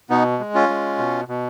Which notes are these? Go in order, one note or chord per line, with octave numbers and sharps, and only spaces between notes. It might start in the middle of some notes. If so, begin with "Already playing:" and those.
B2 B3 D#4
G#3
C#4 F4
G#3
B2
B2